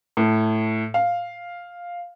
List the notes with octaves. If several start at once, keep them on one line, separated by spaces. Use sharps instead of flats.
A2
F5